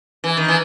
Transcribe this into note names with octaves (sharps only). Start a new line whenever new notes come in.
E3
D#3
E3